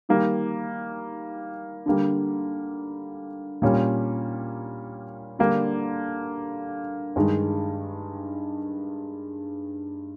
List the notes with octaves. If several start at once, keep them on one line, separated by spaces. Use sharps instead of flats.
D#3 G3 A#3
D3 G3 A#3
A#2 G3 A#3 C#4
D3 G3 A#3 D4
G2 D#3 G#3